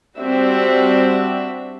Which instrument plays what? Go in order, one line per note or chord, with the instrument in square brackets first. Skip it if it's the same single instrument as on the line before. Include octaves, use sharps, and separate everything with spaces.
[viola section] G3 C4 D4 F#4 E5